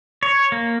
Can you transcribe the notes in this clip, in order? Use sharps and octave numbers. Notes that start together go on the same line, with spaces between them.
C#5
A#3